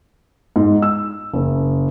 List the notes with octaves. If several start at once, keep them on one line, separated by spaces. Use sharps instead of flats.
G#2
E6
F#1